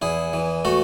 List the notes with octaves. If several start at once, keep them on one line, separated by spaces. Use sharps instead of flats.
E2 E4 G#4
E3
A3 F#4 A4